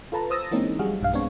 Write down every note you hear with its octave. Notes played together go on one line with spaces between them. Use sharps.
F4 A4 B4 A5 A#5
C5 D#6 E6 A6 A#6
E3 G#3 A#3 C4 C#4 D#4
F#3 G3 F#4 G#4 F5
B1 G2 F5
G#3 B3 C4 D4 C#5